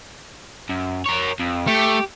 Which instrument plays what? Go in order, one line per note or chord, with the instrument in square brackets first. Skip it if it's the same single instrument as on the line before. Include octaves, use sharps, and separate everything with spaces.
[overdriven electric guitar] F#2
A#4 C#5
F2
[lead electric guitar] A3 [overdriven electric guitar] G4